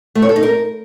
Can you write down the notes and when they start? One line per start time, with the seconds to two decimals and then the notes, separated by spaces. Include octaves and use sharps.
0.15 A3
0.22 C#5
0.29 A4
0.36 D#4
0.43 A#4